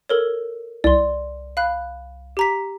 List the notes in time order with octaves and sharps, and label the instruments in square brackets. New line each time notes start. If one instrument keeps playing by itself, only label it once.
[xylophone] A4 A#4 C#5
[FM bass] C2 [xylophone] D5 C6
[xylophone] F5 B5 F#6
G4 A#5 B6